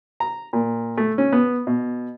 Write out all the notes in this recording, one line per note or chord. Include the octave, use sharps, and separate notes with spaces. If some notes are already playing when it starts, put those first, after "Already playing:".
A#5
A#2
A3
C#4
B3
B2